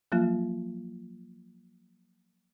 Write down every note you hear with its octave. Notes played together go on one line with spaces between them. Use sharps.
F3 F#3 A#3 F4